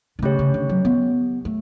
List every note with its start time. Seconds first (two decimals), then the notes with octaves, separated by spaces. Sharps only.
0.19 D3
0.22 C#3 A3 C#4 G4 C#5
0.39 C#3
0.54 D3
0.69 F#3
0.85 B3
1.45 A3